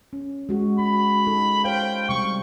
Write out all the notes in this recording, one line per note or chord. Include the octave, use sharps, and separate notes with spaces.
C#4
G#3 F#4
F#4 B5
D#4 A4
C5 C#5 F5 G5
C3 G3 C#6